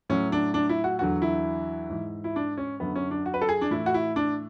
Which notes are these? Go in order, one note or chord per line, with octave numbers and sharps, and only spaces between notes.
A2 F#3 C#4
D4
D4
E4
F#4
E2 D3 F#3 F#4
E4
G#2 E3
E4
D4
C#4
F#2 D3 F#3 B3
C#4
D4
F#4
B4
A4
G#4
D4
A2 E3 E4
F#4
E4
D4